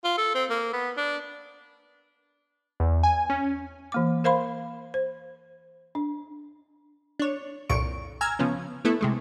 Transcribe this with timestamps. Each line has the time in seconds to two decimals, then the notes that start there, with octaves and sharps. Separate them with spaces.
0.04 F4
0.18 A4
0.35 C4
0.50 A#3
0.73 B3
0.97 D4
2.80 E2
3.03 G#5
3.30 C#4
3.92 E3 A#3 D6
4.24 A#4 C5 F5 B5 C6
4.94 C5
5.95 D4
7.20 D4 C#5
7.69 C2 F2 A#2 C#6 D7
8.21 G#5 A#5 E6 F6 G#6
8.39 C#3 F3 B3 C#4
8.85 A3 B3 E4 A4
9.01 C3 G#3 A3